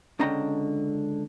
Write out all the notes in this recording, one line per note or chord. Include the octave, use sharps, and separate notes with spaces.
C#2 D3 C#4 D#5 G5 A#5